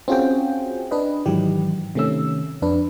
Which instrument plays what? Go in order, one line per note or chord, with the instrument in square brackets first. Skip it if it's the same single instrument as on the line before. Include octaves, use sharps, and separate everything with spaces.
[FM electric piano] C4 C#4 F4 F#4 G#4 G5
D4 B4 D#5
G#2 D#3 E3 F#3 G4
C3 D#3 A3 C#4 E6
F2 D4 B4